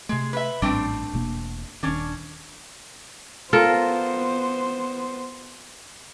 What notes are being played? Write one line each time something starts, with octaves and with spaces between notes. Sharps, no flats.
C3 G#3 A3
B4 E5
A1 G#2 G3 A3 C4 D4
E1 B2 A#3
D#1 D#3 C#4 D4
B3 F4 A4 A#4 C5